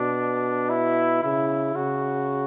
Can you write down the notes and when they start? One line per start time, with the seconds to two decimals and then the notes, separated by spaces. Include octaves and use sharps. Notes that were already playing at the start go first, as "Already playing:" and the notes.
Already playing: B2 D4
0.70 E4
1.23 C#3 E4
1.75 C#3 F#4